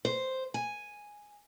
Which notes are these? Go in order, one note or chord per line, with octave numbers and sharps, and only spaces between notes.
C5
G#5